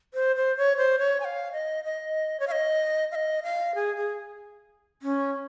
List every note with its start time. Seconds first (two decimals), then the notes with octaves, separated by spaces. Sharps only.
0.14 C5
0.36 C5
0.57 C#5
0.77 C5
0.99 C#5
1.20 G#5
1.25 F5
1.52 D#5
1.84 D#5
2.40 C#5
2.47 F5
2.52 D#5
3.11 F5
3.15 D#5
3.43 F5
3.75 G#4
3.97 G#4
5.02 C#4